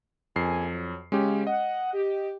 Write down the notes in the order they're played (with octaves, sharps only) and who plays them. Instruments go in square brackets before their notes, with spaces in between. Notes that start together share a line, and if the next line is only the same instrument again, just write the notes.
[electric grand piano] F2 C7 [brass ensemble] C#3 A#3 G#5
[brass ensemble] F#3
[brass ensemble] C#3 [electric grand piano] G#3 C#4 G4
[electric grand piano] D#5 [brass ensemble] F#5
[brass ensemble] G4